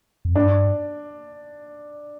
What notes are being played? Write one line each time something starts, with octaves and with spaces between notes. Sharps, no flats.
F2
G2 D4